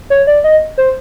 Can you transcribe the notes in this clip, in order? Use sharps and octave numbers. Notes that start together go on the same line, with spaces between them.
C#5
D5
D#5
C5